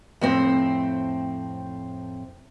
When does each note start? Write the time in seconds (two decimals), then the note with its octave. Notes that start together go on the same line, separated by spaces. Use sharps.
0.21 F2 A2 C4